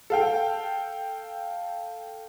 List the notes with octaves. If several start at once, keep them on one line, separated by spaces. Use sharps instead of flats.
A4 F5 G5